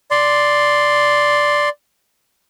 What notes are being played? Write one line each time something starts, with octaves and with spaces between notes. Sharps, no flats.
D5 C6